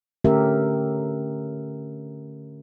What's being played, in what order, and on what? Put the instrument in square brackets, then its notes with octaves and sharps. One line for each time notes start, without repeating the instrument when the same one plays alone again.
[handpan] D3 A3 C#4 G4 A#4 E5